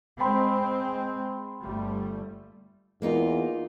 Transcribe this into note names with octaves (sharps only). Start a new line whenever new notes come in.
G#3 C4 G5 B5 C6
G1 G3 A3
E2 A#3 D#4 F4